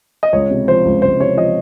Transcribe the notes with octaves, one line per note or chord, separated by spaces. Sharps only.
D#5
C#2 C#5
C3
F3 C5
C#2
C#2 C5
C3 C#5
F3 D#5